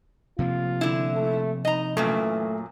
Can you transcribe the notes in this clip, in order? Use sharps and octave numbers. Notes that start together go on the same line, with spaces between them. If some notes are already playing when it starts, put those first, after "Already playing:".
C3 F3 A#3 F4
D3 E4
A3
D#4 D#5 A#5
F#2 A#2 E3 F#3 A3